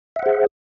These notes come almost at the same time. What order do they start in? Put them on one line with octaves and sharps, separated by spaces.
E5 F#5 C5 G#4